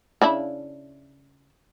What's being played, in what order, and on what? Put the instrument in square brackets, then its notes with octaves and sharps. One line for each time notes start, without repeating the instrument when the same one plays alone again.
[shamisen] C#3 D4 E4